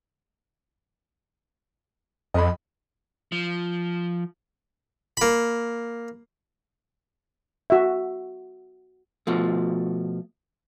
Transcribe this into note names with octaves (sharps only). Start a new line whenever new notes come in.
F2 D#5 B5
F3
A#3 B5
F#4 E5
B2 F3 A3